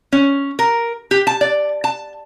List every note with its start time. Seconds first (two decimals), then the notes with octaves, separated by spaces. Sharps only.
0.12 C#4
0.59 A#4
1.11 G4
1.27 A5
1.41 D5
1.84 A5